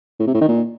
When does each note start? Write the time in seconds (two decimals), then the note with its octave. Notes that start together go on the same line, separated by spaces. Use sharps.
0.20 A2
0.27 C3
0.34 A2
0.41 D#3
0.48 A#2